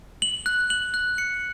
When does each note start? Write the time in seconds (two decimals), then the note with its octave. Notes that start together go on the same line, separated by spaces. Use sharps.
0.22 F#7
0.46 F#6
0.70 F#7
0.94 F#6
1.18 C#7